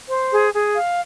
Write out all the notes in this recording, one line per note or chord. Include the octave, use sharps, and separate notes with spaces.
C5
G#4
G#4
F5